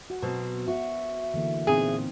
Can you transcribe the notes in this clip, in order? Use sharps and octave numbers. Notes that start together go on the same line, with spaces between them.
F#4 F#5
B2 F#3 C4 B4 C5
F#4 E5
D3 E3 A#3
A#2 B3 C4 D#4 G#4